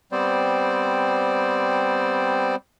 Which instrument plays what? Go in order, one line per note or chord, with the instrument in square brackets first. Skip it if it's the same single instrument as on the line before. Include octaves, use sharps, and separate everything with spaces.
[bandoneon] G3 B3 C4 C5 D5